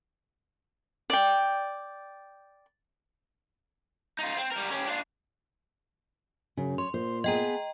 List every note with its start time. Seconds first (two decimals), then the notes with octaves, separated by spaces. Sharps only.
1.10 D5 G5
4.19 D#4 F4
4.37 C4
4.51 G3 A#4
4.71 C#4 G4
4.87 D4 F4
6.57 F#2 C#3
6.78 C#5 C6
6.94 A#2 C5
7.24 B3 G#4 D#5 G5 A#5